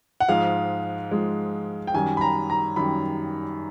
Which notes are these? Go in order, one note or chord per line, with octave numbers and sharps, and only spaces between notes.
F#5
G#2 F3 G#3 F5
G#2 F3 G#3
G5
F#2 D#3 G3 G#5
B5
A#5
A#5
F#2 D#3 G3 B5